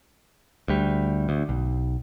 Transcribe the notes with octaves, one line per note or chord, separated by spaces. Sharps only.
D2 G3
D2
B1